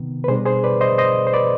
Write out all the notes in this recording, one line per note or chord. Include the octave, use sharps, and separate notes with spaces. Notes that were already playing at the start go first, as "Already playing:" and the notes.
Already playing: C3 D#3 B3
B4
B2 G3 D4 G#4 C5
G#4 C5
B4 D5
C5 D#5
C5 D#5
C5
B4 D5